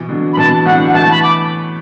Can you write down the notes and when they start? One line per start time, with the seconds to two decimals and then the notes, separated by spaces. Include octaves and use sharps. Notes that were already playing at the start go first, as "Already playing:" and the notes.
Already playing: B2 E3
0.09 D3 F#3
0.33 B5
0.37 B2 E3 A5
0.65 A2 D3 F#5
0.84 F#3 F#5
0.94 E3 A3 A5
1.11 B5
1.23 D6